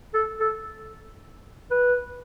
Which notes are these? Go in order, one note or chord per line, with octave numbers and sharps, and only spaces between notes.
A4
A4
B4